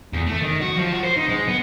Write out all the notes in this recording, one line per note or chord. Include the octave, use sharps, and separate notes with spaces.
E2
A3
D#3
F#4
F3
F#4
C5
D#4
G#3
B3